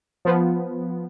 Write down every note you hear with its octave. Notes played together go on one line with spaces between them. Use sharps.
F3 B3